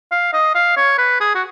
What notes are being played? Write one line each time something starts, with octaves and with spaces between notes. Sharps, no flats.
F5
D#5
F5
C#5
B4
G#4
F#4